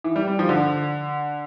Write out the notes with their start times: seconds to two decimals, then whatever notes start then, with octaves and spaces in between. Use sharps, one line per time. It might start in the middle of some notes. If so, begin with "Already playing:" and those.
0.04 E3
0.16 G3
0.28 G3
0.39 F3
0.49 D3